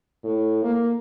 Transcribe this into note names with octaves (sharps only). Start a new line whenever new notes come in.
A2
A#3